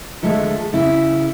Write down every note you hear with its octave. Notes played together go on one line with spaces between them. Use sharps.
D3 F3 G#3 A3
C#3 E4